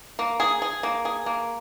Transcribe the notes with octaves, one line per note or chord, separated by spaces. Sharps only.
A#3
G#4
G#4
A#3
G#4
A#3